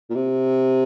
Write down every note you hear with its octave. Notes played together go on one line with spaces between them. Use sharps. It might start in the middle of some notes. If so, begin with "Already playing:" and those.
A#2
C3